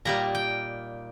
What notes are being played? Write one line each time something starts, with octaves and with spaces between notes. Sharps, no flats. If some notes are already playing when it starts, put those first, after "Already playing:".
A#2 G3 A#3 D#4 A#5
G5